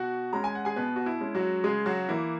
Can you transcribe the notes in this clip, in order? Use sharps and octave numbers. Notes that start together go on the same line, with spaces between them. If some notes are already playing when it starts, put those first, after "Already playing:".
Already playing: B2 F#4 F#5
G#3 C#4 A#5
G#5
F#5
G#4 G#5
B2 B3 B4
F#4
E4
G#3 C#4
F#3 F#4
C#3 G#3 G#4
F#3 F#4
E3 A#3 E4